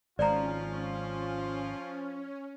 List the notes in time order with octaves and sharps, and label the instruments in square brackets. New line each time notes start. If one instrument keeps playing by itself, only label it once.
[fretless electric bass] G#1 G#3 [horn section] F3 F4 [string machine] C#4 [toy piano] D5 A#5